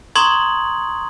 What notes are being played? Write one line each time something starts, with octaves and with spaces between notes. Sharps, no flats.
A#5 C6 C#6 D#6 G#6 F#7